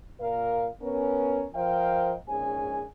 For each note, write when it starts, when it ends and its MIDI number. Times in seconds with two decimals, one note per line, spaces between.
0.20 0.66 46
0.20 0.66 70
0.20 0.66 77
0.81 1.45 59
0.81 1.45 61
0.81 1.45 70
1.54 2.14 53
1.54 2.14 70
1.54 2.14 72
1.54 2.14 75
1.54 2.14 77
1.54 2.14 79
2.28 2.83 34
2.28 2.83 44
2.28 2.83 61
2.28 2.83 68
2.28 2.83 80